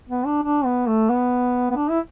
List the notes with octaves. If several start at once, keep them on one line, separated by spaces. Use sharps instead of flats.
B3
D4
D4
B3
A3
B3
B3
D4
E4